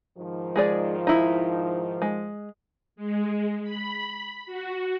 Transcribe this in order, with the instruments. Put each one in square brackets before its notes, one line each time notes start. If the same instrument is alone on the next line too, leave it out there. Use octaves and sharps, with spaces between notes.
[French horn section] G#2 D#3 F3
[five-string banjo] G#3 G#4 D5
D#4 E4
G#3
[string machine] G#3
B5
F#4